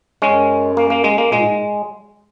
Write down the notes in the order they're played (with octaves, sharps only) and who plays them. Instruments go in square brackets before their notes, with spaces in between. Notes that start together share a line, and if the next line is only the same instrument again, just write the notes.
[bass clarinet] F#2 [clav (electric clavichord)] G#3 C#4
[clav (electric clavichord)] A#3
A#3
G#3
A#3
[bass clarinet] A#2 [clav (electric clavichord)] G#3
[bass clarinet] G#2